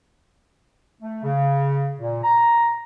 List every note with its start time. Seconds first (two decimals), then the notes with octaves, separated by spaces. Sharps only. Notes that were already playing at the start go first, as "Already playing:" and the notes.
1.01 A3
1.23 C#3
1.98 A#2
2.23 A#5